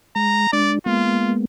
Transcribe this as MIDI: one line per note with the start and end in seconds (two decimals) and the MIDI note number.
0.16 0.47 56
0.16 0.49 82
0.53 0.79 56
0.53 0.79 62
0.53 0.73 74
0.86 1.45 56
0.86 1.45 58
0.86 1.45 59
0.86 1.34 65